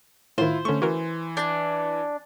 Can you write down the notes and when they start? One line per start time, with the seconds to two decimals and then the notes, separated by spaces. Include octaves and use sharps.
0.38 A2 D#3 E4 F4 C5
0.65 D3 A3 C#4 C#6
0.82 E3 F#4 A#4
1.37 D4 G6 A6